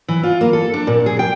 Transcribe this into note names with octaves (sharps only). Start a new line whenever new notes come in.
E3
F4
A#3
A4
D4
A#2
G#4
G5